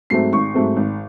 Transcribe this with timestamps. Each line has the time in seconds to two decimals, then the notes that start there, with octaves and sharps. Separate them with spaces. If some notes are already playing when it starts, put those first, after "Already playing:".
0.10 G#2 F#3 A3 C4 C7
0.33 G#1 C#6
0.54 G#2 F#3 A3 C4
0.76 G#1